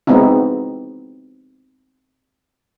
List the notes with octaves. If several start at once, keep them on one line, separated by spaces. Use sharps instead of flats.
G#3 B3 C4 D#4 E4